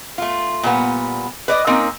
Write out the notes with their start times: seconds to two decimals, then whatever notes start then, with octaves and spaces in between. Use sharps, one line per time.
0.18 A3 F4
0.63 A#2 G3 B3
1.48 B4 D5 D#5
1.67 A#3 C4 C#4 D#4 A#4